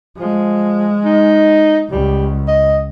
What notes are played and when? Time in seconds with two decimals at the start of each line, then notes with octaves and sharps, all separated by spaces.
0.18 F3 G#3
1.05 D#4
1.90 C#2 G3
2.48 D#5